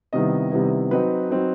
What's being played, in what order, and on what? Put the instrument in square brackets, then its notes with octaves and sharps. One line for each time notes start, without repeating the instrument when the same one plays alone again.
[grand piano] C3 D#3 G3 B3 E4 D#5
C3 D#3 G3 B3 E4
F#3 C4 D#4 B4
F#3 C4 D#4